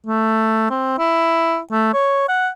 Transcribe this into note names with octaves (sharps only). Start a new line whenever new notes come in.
A3
C4
E4
A3
C#5
F#5